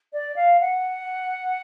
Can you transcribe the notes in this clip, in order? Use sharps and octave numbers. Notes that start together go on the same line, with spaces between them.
D5
F5
F#5